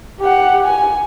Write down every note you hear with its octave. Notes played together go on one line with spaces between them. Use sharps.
G4 F#5
G#5